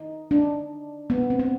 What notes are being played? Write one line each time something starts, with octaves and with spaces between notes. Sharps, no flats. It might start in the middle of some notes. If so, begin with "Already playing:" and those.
Already playing: D#4
D4
B3
C4
B3